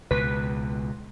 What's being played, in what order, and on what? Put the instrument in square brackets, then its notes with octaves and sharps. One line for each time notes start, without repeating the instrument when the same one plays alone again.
[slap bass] C#2 B2 [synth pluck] B4